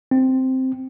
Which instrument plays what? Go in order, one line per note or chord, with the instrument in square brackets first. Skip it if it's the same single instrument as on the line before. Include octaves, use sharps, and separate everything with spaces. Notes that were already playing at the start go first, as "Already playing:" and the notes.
[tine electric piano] C4